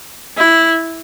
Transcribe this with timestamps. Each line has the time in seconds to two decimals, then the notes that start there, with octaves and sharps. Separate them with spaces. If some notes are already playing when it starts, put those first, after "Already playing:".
0.38 E4